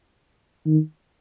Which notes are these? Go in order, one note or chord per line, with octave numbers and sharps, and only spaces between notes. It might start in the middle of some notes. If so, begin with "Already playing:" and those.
D#3